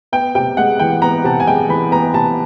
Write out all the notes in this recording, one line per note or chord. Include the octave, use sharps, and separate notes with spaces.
B3 G5
C3 G5
G#3 F#5
E3 G5
B3 A#5
C3 A5
G#5
G#3 G5
E3 B5
B3 A#5
C3 A5